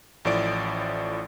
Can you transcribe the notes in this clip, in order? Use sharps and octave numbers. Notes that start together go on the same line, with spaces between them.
A1 A2 F3 D5 D7